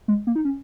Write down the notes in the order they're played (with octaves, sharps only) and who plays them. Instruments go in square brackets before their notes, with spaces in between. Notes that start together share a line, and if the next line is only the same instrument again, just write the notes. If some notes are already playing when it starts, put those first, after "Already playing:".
[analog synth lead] G#3
A#3
D#4
C#4